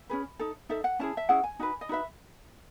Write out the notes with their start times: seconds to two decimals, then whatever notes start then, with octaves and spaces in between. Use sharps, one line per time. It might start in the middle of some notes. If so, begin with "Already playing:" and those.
Already playing: E5
0.09 C#4 G#4 B4
0.39 D#4 A4
0.69 D#4 A4 E5
0.84 F#5
0.99 C#4 E4 G#4 A5
1.17 E5
1.29 C#4 E4 G#4 F#5
1.44 G#5
1.59 D#4 F#4 B4
1.81 D#5
1.89 D#4 F#4 B4 E5